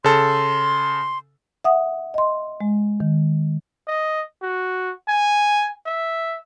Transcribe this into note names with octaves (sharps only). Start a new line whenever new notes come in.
C#3 A4 C6
E5 F#5 D#6
D#5 C6
G#3
D#3
D#5
F#4
G#5
E5